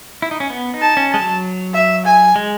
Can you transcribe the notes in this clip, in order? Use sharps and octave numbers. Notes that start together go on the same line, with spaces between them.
E4
D#4
C#4
B3
D#4
A5
C#4
G#3 A5
F#3
E5
G#5
G#3